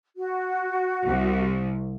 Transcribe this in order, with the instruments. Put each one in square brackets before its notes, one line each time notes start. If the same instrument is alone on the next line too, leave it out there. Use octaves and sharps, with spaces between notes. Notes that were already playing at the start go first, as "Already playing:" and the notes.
[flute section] F#4
[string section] C2